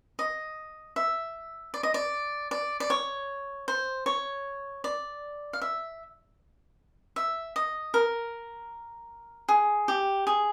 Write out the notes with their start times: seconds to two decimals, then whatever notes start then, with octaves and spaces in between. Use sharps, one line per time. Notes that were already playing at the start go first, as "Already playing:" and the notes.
0.19 D#5
0.96 E5
1.74 D5
1.83 D#5
1.94 D5
2.51 D5
2.80 D5
2.90 C#5
3.68 C5
4.06 C#5
4.84 D5
5.53 F5
5.62 E5
7.16 E5
7.56 D#5
7.94 A#4
9.49 G#4
9.88 G4
10.27 G#4